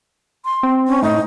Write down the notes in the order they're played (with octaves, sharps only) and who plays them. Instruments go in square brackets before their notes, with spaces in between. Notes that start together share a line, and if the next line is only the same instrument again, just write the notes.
[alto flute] C6
[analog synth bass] C4
[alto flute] C#4
[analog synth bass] A2 [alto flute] D#4